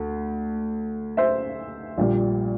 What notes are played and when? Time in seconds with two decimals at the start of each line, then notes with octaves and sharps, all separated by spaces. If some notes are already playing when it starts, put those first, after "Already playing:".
Already playing: D2
1.17 C5 E5
1.98 A#1 A#2 G3